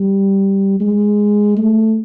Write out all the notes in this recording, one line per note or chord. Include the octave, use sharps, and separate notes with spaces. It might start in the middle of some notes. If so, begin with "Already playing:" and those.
Already playing: G3
G#3
A3